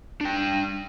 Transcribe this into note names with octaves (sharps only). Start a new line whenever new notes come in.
D4 G5